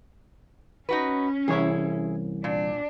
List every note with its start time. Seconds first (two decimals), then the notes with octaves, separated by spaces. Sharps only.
0.89 C#4 D#4 F#4 B4
1.48 C2 E3 E4 G#4 C#5
2.44 A#2 D4